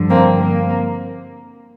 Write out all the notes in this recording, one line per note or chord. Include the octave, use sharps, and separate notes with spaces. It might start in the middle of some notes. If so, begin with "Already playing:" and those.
Already playing: G2 D3 F3
A#3 C4
A#3